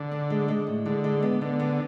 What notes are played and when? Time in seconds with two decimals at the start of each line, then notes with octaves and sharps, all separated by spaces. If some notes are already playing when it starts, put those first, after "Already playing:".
Already playing: D3
0.11 D4
0.30 G#3
0.48 G#3
0.67 A2
0.86 D3 G#3
1.04 G#3
1.22 B3
1.41 D3 B3
1.60 B3